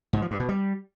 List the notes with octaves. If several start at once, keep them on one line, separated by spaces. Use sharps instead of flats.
G#2
F3
G2
B2
G3